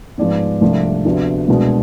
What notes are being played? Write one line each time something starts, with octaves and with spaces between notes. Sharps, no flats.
G#2 F3 G#3 B3 D5
C2 C3 F3 A3 D4
D2 C3 F3 B3 D4
C2 B2 G#3 D4